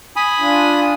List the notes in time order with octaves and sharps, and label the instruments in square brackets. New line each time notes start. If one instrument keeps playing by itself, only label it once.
[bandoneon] G#5 B5 D#6
[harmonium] D4 F4